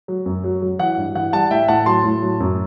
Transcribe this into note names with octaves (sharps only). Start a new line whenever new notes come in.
F#3
F#2
F#3
F#3
E3 F#5
G2
E3 F#5
G3 F#5 A5
A2 E5 G5
A2 F#5 A5
F#3 A5 C6
A2
F#3
F#2